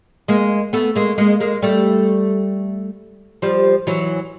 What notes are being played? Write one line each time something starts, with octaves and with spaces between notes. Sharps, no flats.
G#3 A#3
A3 B3
G#3 A#3
G#3 A#3
G#3 A#3
G3 A3
F3 G3
E3 F#3